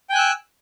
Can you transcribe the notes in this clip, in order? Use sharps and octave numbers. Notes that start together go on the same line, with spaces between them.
G5 G#5 E6 F#6